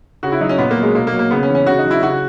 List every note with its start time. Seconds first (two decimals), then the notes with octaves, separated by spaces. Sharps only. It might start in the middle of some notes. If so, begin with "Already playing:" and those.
0.23 C#3 F#4
0.32 E4
0.41 F#3 D#4
0.49 C#4
0.58 A#2 B3
0.71 A#3
0.77 F#3
0.82 G#3
0.95 B2 A#3
1.07 A#3
1.13 F#3
1.19 A#3
1.31 C#3 B3
1.43 C#4
1.49 E3
1.55 C#4
1.66 C#3 F#4
1.79 D#4
1.85 F#3
1.91 E4
2.02 C#3 F#4